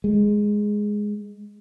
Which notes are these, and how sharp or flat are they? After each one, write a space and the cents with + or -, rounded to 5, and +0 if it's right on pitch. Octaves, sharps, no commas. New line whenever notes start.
G#3 +0